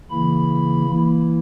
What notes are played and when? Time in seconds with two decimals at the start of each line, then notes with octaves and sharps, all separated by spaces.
0.10 C#3 E3 A#3 E4 B5
0.87 E3 A#3 E4